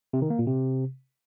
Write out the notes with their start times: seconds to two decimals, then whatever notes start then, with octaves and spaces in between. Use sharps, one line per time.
0.13 C3
0.22 D#3
0.30 A#3
0.39 A#2
0.47 C3